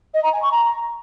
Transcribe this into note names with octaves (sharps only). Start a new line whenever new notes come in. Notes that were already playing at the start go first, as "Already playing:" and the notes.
D#5
A#5
G#5
C#6
A#5